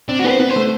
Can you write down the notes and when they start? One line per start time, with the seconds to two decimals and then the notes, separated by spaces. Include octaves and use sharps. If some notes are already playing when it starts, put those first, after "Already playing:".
0.09 C4 D4
0.19 F#4
0.24 B3
0.30 C5
0.40 B3 B4
0.50 C5
0.56 A3